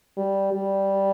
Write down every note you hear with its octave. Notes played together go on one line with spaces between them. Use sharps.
G3
G3